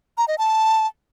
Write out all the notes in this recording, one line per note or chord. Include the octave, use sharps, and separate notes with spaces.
A#5
D#5
A5